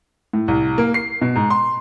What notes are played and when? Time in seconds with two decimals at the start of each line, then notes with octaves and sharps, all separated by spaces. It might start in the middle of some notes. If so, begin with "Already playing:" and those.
0.33 A2
0.48 C2
0.78 A#3
0.94 C7
1.21 B2
1.36 G#2
1.50 C6